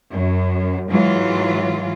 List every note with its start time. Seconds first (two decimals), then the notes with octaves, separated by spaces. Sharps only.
0.10 F#2
0.90 G#2 E3 F#3 F4